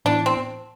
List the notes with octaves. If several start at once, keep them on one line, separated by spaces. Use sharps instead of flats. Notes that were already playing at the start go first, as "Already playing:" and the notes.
A2 E3 B3 D4 E4
C4